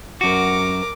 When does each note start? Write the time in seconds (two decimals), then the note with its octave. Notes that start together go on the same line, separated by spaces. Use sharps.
0.21 F#2 F#4 A#4 D6